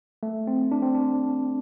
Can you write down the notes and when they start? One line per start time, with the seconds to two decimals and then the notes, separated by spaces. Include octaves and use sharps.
0.23 A3
0.47 C4
0.72 D4
0.82 C4
0.95 D4